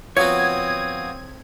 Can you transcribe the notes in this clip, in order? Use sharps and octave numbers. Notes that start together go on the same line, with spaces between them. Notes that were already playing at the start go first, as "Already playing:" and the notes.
F3 B3 C4 F#4 C#5 D#6 G#6